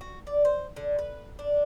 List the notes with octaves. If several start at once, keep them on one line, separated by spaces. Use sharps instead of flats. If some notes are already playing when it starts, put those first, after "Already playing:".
F#4
D5
C5
D3
B4
D4